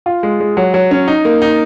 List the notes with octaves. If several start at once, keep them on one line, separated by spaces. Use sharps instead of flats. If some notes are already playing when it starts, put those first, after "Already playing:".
F4
G#3
G#3
F#3
F#3
C#4
D#4
A#3
D#4